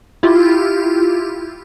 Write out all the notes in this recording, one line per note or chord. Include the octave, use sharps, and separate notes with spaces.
E4 F4 G4